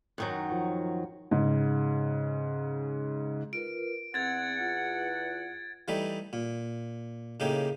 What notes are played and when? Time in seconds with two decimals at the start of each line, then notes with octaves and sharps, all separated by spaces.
0.18 F#2 D#3 F#3
0.52 F3
1.31 G#2 C#3
3.53 F4 A#4 B4 D7
4.14 E2 C4 F#5 E6 G#6 A6
4.60 F4
5.88 E3 G3 A3 D#4
6.33 A#2
7.40 A2 C#3 A#3 D#4 G4